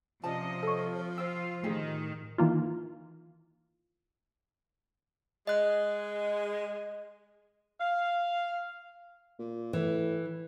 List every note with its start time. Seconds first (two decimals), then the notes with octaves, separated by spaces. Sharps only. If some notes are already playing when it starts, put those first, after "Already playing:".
0.24 C3 F3 C#4 D5 D#5 A5
0.63 A4 C#5 G5
1.18 F4 C5 G5 E6
1.63 A2 D#3 F4 G4 G#4
2.38 D#3 E3 A#3 F4
5.47 G#3 D#5 F#6
7.80 F5
9.39 A#2
9.73 A2 E3